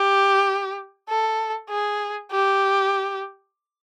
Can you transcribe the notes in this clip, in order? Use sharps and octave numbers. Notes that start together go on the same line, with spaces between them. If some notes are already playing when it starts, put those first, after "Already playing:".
Already playing: G4
A4
G#4
G4